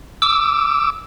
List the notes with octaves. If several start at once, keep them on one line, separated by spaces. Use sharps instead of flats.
D6 E6